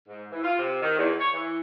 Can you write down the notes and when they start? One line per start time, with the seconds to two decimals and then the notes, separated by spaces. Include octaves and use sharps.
0.08 G#2
0.32 E3
0.44 F4
0.59 C3
0.82 D#3
0.98 E2
1.20 C#5
1.34 E3